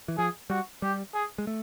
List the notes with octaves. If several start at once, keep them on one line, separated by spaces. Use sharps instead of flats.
E3
F3 G#4
G3 F#4
G3 G4
G#4
G#3
A3